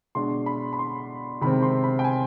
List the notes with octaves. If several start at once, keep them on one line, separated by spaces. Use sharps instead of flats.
B2 G#3 D4 C6
B5
B5
C6
C3 D#3 G#3 C4 B5
C6
B5
G5
G#5